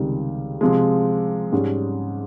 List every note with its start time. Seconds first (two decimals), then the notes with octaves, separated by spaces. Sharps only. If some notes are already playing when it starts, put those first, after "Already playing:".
Already playing: C#2 C3 D#3 G3
0.61 C3 F3 G#3
1.52 G#2 G3 C#4